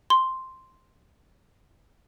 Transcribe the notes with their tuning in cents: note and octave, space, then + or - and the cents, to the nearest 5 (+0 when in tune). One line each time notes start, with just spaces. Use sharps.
C6 +0